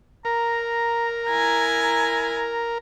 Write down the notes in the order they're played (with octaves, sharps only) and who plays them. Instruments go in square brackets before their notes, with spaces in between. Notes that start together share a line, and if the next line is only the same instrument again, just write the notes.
[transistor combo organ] A#4 [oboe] A#5
[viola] E4 G#5